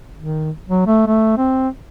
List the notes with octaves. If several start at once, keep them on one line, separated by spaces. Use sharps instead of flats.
D#3
F#3
A3
A3
C4